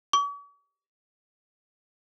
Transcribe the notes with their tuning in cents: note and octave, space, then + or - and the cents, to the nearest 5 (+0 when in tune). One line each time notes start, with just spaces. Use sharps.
C#6 +45